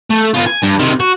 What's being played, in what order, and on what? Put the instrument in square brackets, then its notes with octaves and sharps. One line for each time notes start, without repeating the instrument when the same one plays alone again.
[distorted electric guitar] A3
B3 F4
G#5
G2
C3 D#3
F#4